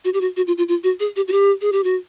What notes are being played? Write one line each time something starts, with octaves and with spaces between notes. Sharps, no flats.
F#4
G4
F#4
F#4
F4
F4
F4
F#4
G#4
G4
F#4
G4
G#4
G4
F#4